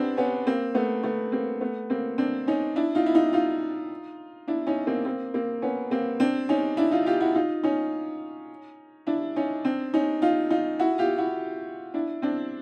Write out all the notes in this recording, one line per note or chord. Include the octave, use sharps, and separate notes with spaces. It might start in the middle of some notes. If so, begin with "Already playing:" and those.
Already playing: B3 C4 D4
B3 C#4
A#3 C4
A3 B3
A3 B3
A#3 C4
A3 B3
A#3 C4
C4 D4
C#4 D#4
D4 E4
D#4 F4
E4
D#4 F4
D#4 F4
D4 E4
C#4 D#4
A#3 C4
A#3 C4
A#3 C4
B3 C#4
A#3 C4
C4 D4
C#4 D#4
D4 E4
D#4 F4
F4 G4
E4 F#4
D#4 F4
C#4 D#4
D4 E4
C#4 D#4
C4 D4
C#4 D#4
D#4 F4
D#4 F4
E4 F#4
F4 G4
E4 F#4
D4 E4
C4 D4